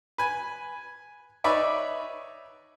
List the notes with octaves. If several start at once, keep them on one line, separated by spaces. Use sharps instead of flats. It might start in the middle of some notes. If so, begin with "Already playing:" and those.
B4 G#5
D#4 B4 C#5 D5 E5